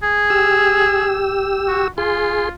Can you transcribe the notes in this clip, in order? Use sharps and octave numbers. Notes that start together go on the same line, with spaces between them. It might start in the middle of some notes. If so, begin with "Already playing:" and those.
G#4
G4 E6
F#4
F4 G#4 C6